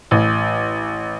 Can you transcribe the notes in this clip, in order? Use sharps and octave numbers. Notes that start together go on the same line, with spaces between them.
A1